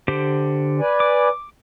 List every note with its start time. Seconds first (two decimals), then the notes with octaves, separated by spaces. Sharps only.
0.08 D3 G4 C5
0.80 B4 D5 G#5
1.00 D6